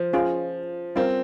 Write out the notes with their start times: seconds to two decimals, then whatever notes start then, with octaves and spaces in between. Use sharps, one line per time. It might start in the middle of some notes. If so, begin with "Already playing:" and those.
Already playing: F3
0.13 C#4 F4 G#4
0.95 G3 C4 C#4 F4 A#4